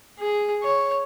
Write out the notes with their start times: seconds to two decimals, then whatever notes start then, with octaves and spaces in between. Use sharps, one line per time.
0.19 G#4
0.63 C#5